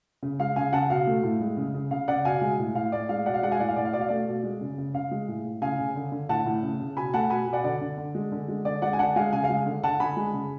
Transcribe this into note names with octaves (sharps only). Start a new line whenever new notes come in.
C#3
G#3 F5
C#3 F5 G#5
C#3 F#5 A5
B2 F5
A3
A2
G#3
C#3
C#3
C#3 F5
C#3 D5 F#5
B2 F5 G#5
G#3
A2
A2 F5
A2 D5
G#3 F5
B2 D5 F#5
F5
G#3 D5 F#5
F5 G#5
A2 D5 F#5
F5
A2 D5
F5
B2 D5
F5
A3 D5
B2
G#3
C#3
C#3
C#3 F5
G#3
A2
A2
C#3 F5 G#5
C#3
D3
D3
A2 F#5 A5
A2
C#3
C#3
B2 G#5 B5
A3 F#5 A5
B2 G#5 B5
B2
D5 F#5
D3 D5
D3
D3
G#3
D3
G#3
D3 D5
G#3 D5 F#5
G#5
D3 F#5 A5
G#3 F5 G#5
C#3 F5 G#5
F5
G#3
D3
D3 F#5 A5
D3 G#5 B5
G#3
C#3